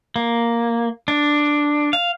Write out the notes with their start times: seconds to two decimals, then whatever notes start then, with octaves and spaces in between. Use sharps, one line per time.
0.16 A#3
1.08 D4
1.93 F5